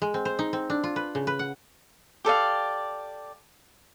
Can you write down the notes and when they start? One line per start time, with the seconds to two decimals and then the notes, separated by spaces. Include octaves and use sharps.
0.02 G#3
0.14 C4
0.25 C5
0.39 D#4
0.53 C4
0.70 D4
0.84 F4
0.96 B4
1.15 C#3
1.27 B4
1.39 F#5
2.25 G4 A4 D5 F5